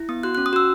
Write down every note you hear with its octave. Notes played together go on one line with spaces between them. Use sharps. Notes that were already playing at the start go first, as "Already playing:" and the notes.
Already playing: E4
B3 D#6
F#4 F#6
C#4 F#6
D#6
F#4 E6